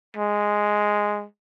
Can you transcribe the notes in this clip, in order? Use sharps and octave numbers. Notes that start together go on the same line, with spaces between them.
G#3